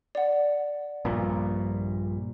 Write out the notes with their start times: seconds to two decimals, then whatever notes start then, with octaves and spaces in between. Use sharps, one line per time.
0.15 D5 F#5
1.05 A#1 G2 A#2